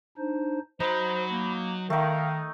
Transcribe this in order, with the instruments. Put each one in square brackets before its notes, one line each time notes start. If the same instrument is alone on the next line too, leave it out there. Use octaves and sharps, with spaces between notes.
[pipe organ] D4 D#4 C5
[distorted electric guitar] F#3 [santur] D#4 [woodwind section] C5 [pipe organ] B5
[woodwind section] A#3
[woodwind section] D#3 [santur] A3 D#4 [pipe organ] F5